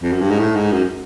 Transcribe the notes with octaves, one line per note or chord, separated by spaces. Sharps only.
F2
F#2
G2
G#2
A2
G#2
F#2